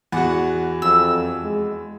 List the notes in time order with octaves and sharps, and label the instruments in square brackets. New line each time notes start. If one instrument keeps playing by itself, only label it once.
[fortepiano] E2 F#4 [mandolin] F#5
[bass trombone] F2 [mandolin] E6
[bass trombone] G#3